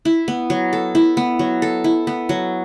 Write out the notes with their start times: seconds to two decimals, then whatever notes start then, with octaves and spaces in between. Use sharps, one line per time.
0.05 E4
0.28 B3
0.50 F#3
0.73 A4
0.95 E4
1.17 B3
1.39 F#3
1.62 A4
1.84 E4
2.07 B3
2.29 F#3